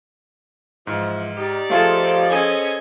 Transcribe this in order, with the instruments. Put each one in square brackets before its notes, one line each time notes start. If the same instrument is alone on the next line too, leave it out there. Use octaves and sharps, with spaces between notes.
[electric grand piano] G#2 [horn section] E3 F3
[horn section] D#4 G4 D5
[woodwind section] F3 [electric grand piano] A3 F4 G#4 [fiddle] A4
[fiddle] C#4 [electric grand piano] G#4 A4 C5 [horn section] D#5 G#5